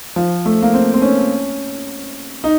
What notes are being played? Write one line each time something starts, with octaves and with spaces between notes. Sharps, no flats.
F3
A3
A#3
C4
C4
C#4
D#4